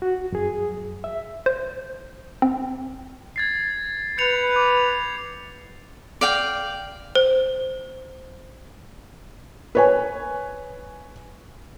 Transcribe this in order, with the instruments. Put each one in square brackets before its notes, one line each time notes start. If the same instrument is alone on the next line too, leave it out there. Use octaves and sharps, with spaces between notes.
[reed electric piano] F#4
F#2 G#4
E5
[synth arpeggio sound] C5
C4
[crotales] G#6 A6 C7
[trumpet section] B4 [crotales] G6 C#7 F7
[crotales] D6
[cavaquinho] D5 F5 G5
[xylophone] C5
[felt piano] B4 C#5 G#5